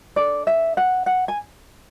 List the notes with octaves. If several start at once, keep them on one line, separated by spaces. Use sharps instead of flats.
D4 A4 D5
E5
F#5
F#5
G#5